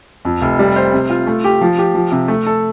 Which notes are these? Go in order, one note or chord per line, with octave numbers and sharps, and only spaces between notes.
F2
F1
G3
C5
C3
F4
A3
G4
F3
G4
F3
C3
A3
A4